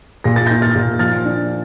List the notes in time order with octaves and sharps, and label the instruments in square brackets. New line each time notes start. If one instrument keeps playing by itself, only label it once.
[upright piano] A#2 A#6
A6
D#4 G6 A#6
F6 A6
A#2
F3 F6 A6
D4